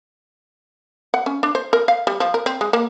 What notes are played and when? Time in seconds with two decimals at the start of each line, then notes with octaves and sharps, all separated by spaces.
1.14 F#5
1.26 C#4
1.43 D4
1.55 C5
1.73 A#4
1.88 F5
2.07 G3
2.20 F3
2.34 A#4
2.46 C4
2.61 G#3
2.73 A#3